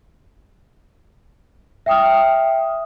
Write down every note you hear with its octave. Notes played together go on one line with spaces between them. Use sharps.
E5 G5 D#6 F6